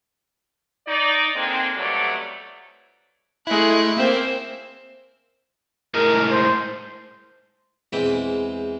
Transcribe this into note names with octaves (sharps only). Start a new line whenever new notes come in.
D#4 D5
D3 G#3 A#3 C4
F2 B2 F#3 G3 A3 D5
G#3 A3 E4 F#6
A#3 C4 C5 E5
A2 G#3 A#4
C5
E2 E3 G#3 C4 G5 B5